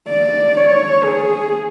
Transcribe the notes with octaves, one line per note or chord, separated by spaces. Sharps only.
D5
C#5
G#4